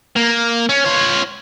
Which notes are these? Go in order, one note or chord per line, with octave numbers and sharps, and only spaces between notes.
A#3
C#4
F4 C#5